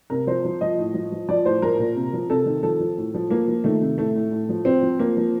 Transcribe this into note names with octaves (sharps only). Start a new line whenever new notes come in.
C3 A#4
F3 C5
F3
F3 D#5
A2
F3
F3
F3 D5
A2 C5
F3 A#4
A#2
C3
F3
C3 A4
D#3
F3 A4
F3
A2
F3
F3 A#3
F3
D#3 A3
C3
A2 A3
A2
A2
F3
F3 C4
F3
F3 A#3
F3